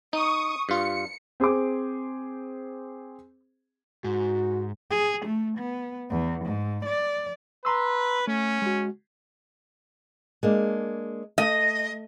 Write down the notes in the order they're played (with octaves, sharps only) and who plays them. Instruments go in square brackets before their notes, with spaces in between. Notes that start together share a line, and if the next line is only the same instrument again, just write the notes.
[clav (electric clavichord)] D#4 [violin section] C#6 D#6
[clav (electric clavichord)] G2 F4 [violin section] C#7
[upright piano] C4 G#4 C5 D6
[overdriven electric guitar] G#2 [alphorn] F#4
[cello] G#4
A3
B3
E2
G#2
D5
[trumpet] B4 [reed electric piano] A#5 C6 E6
[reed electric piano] A3 [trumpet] C#4
[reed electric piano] G#3 F#4
[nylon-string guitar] G#3 A#3 D4
[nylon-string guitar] A3 [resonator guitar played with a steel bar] D#5